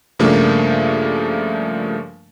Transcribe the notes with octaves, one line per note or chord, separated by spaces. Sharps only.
G2 C#3 F3 A3 A#3 D4